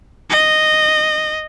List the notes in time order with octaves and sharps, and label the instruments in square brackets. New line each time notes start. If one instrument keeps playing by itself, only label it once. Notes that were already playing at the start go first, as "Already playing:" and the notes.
[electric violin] D#5